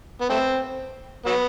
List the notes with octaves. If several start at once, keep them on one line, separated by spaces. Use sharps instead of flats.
B3
A3 C4
F#3 B3